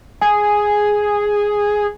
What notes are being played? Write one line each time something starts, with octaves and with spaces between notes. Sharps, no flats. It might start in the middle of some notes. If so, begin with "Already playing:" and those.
G#4 G#5